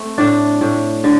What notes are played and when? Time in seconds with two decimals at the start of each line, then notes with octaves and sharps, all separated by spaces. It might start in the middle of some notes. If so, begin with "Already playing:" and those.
Already playing: A3 C4
0.18 A2 D4
0.61 A2
1.04 D3